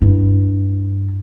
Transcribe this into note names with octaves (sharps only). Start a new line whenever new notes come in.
G2 E4